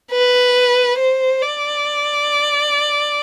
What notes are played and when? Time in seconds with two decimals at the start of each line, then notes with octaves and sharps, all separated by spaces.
0.11 B4
0.98 C5
1.42 D5